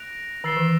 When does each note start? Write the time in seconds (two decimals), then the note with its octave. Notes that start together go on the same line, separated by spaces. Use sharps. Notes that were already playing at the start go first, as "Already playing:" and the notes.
Already playing: F#6 A#6 D7 F7
0.44 D#3 E6 A6 C7 E7 G7
0.57 E3